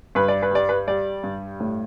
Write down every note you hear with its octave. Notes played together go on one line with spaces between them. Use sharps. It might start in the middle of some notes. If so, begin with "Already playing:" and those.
G2 B4
D5
B4
G3 D5
B4
G3 D5
G2
A2